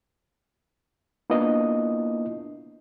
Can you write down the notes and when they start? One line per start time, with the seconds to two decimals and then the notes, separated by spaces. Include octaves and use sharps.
1.30 A#3 B3 D4 E4 F4 D#5